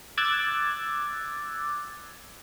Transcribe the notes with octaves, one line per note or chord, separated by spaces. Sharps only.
D6 E6 F#6 G#6 A6